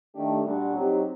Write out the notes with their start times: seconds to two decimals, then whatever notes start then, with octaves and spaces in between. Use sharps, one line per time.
0.14 D#3 A3 D4 G4
0.44 A#2 G3 D4 F#4
0.73 F#3 C4 D#4 G4